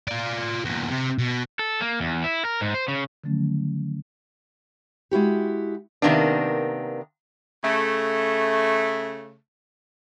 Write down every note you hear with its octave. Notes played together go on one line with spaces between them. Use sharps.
F4 D5
E2 A#2
C3
B2
A4
A#3
E2
E4
A#4
G#2
C5
C#3
D3 D#3 F3 F#3 A3 C#4
G#3 E4 F#4 G4
C3 D#3 A#3 B3 D4
C#3 A3